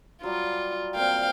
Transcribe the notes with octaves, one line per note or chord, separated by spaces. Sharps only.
F#3 G3 F4
A#2 C4 F5 G5